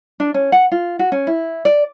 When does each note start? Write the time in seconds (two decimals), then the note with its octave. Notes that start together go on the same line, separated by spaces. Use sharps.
0.20 D4
0.34 C#4
0.52 F#5
0.72 F4
0.99 F#4
1.12 C#4
1.27 E4
1.65 D5